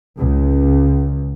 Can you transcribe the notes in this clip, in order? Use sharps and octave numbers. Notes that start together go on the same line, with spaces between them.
C#2